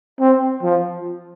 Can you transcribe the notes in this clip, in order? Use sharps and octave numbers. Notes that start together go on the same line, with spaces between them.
C4
F3